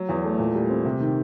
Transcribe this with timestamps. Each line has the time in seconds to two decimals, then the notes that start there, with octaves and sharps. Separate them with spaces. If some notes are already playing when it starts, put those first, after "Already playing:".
Already playing: F#3
0.09 E2
0.23 A3
0.39 A#2
0.55 G3
0.70 C4
0.85 C3
1.00 D#3